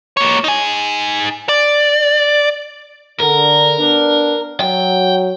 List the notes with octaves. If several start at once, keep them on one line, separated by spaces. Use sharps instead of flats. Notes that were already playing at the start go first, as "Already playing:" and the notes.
A#3 C#5
D#4 G#5
D5
D3 A#4
B3 D4
F#3 G5